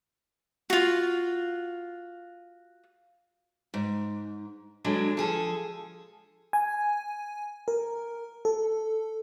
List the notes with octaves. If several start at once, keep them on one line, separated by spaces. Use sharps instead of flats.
F4 F#4
G#2
D3 F#3 G#3 D4
F3 G#4 A4
G#5
A#4
A4